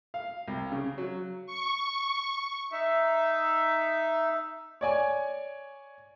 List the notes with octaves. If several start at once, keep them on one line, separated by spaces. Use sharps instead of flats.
F5
C2
C#3
F#3
C#6
D#4 E5
C#5 D5 G#5